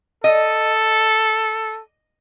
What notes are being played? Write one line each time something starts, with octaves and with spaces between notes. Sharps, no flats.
A4 D#5